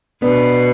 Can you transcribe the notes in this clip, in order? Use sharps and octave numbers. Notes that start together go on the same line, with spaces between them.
B2 B3 D4